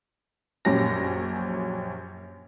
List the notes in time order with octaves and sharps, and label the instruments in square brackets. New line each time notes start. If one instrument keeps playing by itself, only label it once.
[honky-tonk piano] A#1 F#2 C#4 G4 A#6